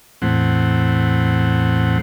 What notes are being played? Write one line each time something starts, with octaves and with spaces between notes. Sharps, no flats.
E2 A2 C4 F#5